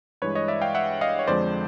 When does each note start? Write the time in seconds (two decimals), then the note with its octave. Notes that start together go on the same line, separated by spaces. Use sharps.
0.22 G2 E3 G#3 B4 C#5
0.35 C#5 D#5
0.48 D5 E5
0.62 F5 G5
0.75 E5 F#5
1.01 D#5 F5
1.19 C#5
1.27 F2 D3 F3 G#3 C5 D5